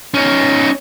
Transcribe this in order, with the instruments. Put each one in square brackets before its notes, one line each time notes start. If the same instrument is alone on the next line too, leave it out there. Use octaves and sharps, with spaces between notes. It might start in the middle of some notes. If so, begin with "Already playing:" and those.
[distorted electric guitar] C#4 D#4